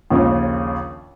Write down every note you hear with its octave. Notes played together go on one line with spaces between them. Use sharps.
A#1 D#2 C#3